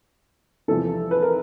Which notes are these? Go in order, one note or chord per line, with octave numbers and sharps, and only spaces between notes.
E2 C3 F3 A4
B4
A#4